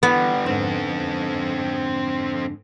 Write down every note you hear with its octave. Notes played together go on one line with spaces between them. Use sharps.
D3 E3 G3 B3
F2 G#2 D3 C4 A4